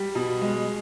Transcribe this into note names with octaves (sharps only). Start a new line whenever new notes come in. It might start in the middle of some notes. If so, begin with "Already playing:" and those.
Already playing: G3
B2
G#3